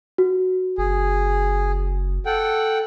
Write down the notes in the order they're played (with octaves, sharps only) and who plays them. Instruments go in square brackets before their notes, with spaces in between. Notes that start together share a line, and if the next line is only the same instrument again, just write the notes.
[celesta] F#4
[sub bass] F#1 [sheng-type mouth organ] G#4
[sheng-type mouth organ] A4 F#5 G5